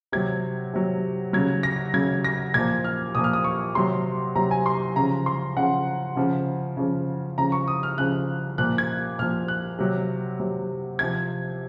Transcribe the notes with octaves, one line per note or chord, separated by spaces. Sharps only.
C3 F#3 G#6
C3 F#3
C#3 F#3 G#6
A#6
C#3 F#3 G#6
A#6
A#2 F3 G#6
F6
A#2 F3 D#6
F6
D#6
C#6
C3 F#3 C6
C3 F#3 A#5
G#5
C6
C#3 F3 A#5
C6
C#3 F3 F#5
C#3 F3
C#3 F3
C#3 F3 A#5
C#6
D#6
F6
C#3 F3 F#6
A#2 F3 F#6
G#6
A#2 F3 F6
F#6
C3 F#3
C3 F#3
C3 F3 G#6